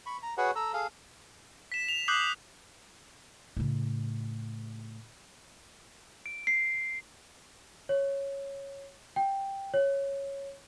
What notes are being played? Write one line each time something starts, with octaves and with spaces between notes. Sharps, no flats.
B5 C#6
A#5
F#4 G#4 B4 C#5 F#5
A4 A#5 E6
G#4 A4 F5
B6 E7
F7
D6 D#6 F#6 G6 C7 F#7
A2 C#3
D7
C7
C#5
G5
C#5